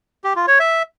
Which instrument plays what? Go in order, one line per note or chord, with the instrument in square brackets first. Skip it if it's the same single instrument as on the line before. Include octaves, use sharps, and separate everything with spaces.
[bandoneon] G4
F4
C#5
E5